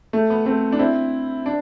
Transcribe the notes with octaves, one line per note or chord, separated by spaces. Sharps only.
A3
B3
A3 C4
D4
C4 E4
D4